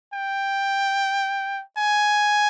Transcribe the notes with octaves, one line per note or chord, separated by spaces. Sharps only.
G5
G#5